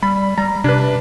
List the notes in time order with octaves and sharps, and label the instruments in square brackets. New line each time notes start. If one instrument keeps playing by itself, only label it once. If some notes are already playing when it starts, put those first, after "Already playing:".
[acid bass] G3 [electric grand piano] B5
[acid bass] G3 [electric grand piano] A#5
[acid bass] C3 [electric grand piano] D4 B4